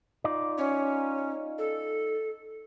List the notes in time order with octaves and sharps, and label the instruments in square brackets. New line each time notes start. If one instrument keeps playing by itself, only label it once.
[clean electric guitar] D#4 F4 D5
[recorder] C#4
A4